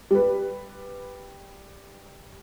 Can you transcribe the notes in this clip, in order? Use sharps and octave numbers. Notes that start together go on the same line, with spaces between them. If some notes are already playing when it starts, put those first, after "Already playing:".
G3 B4